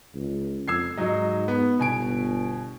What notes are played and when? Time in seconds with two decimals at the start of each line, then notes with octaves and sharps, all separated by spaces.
0.15 C#2
0.68 F2 E6 G#6 C7
0.98 G#2 F#3 D#4
1.48 B3
1.79 G1 B2 G#5 D7